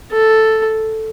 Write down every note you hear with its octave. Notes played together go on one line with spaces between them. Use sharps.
A4